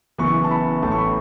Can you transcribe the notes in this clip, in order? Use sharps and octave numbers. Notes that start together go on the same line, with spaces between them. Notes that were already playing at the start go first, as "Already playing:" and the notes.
F#1 F#2 E3 B3 E4 C#6
A5
B5
A1 A2 E3 A3 A5
C#6
B5